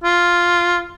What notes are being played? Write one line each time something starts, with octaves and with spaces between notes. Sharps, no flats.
F4